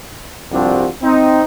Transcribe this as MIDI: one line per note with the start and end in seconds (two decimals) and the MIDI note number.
0.52 0.86 36
0.52 0.86 43
0.52 0.86 53
0.52 0.86 60
0.52 0.86 62
0.52 0.86 66
1.02 1.42 60
1.02 1.42 63